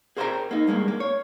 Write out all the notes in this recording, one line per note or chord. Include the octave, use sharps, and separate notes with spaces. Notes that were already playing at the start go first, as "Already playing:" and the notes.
G#4 A#4 C5 D#5 G5 A#5
A#3 D#4
G2 G#3 A#3
A#3
C#5